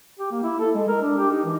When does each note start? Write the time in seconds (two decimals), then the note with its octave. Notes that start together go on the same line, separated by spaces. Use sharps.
0.19 G4
0.31 A#3
0.43 E4
0.60 A4
0.74 G#3
0.88 A#4
1.01 D4
1.18 G4
1.31 D#4
1.45 E3